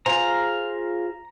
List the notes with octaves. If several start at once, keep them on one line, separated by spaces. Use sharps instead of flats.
F4 G#4 C5 A#5